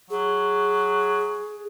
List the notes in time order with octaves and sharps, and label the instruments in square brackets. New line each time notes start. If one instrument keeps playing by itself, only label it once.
[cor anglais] F#3 [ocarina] G#4